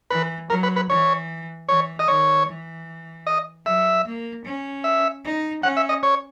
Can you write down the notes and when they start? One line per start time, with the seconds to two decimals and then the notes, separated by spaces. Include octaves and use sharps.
0.10 E3 B4
0.50 F#3 A#4
0.63 B4
0.76 B4
0.90 E3 C#5
1.69 E3 C#5
1.99 D#5
2.08 D#3 C#5
2.48 E3
3.27 D#5
3.66 F#3 E5
4.05 A#3
4.45 C#4
4.84 E5
5.24 D#4
5.63 C#4 F#5
5.77 E5
5.89 D#5
6.03 C#5